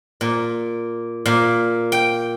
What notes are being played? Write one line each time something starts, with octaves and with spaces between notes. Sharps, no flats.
A#2
A#2
G5